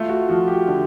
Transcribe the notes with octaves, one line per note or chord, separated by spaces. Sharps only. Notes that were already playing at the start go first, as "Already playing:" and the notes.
Already playing: A3 F4
F#4
F3 F#4
G4
D3